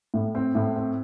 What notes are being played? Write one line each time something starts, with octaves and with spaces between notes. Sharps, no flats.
A2
C4
A2
C4